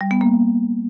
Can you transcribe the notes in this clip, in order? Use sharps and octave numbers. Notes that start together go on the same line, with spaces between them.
G3
B3
A#3